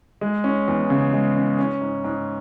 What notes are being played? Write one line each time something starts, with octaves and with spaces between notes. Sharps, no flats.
G#3
C#4
E2
C#3
G#3
C#4
C#4
G#2
G#2